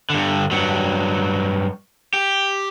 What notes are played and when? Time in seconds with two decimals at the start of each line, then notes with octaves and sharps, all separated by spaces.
0.10 G2 D3
0.51 G2 F#3
2.13 G4